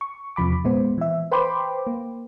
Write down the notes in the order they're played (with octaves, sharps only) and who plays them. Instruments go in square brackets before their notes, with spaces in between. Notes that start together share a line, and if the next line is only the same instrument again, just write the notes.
[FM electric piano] C#6
E2 C3 F3 B5 D6
A#2 G#3 B3 C5
E3 E5
B4 C5 G5 B5 C6 D6
A#3